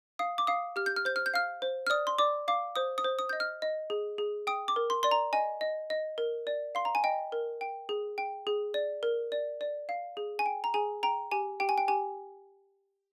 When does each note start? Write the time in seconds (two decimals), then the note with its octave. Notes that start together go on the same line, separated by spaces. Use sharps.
0.19 F5 D#6
0.38 D6
0.47 F5 D#6
0.76 G4 F6
0.86 G6
0.96 F6
1.05 C5 G6
1.16 F6
1.26 G6
1.34 F5 F6
1.62 C5
1.87 F6
1.90 D5 D#6
2.07 C6
2.18 D5 D6
2.48 F5 D6
2.76 C5 D#6
2.98 D#6
3.04 C5
3.19 D#6
3.29 D#5 G6
3.40 F6
3.62 D#5
3.90 G#4
4.18 G#4
4.47 G5 D#6
4.68 D6
4.76 A#4
4.90 C6
5.03 D5 C6
5.11 A#5
5.33 D#5 G#5
5.61 D#5
5.90 D#5
6.18 A#4
6.47 D5
6.75 F5 C6
6.85 A#5
6.95 G#5
7.04 D#5 G5
7.32 A#4
7.61 G5
7.89 G#4
8.18 G5
8.47 G#4
8.74 D5
9.03 A#4
9.32 D5
9.61 D5
9.89 F5
10.17 G#4
10.39 G#5
10.46 G5
10.64 A#5
10.74 G#4 G#5
11.03 G5 A#5
11.31 G4 G#5
11.60 G4 G5
11.69 G#5
11.78 G5
11.88 G4 G#5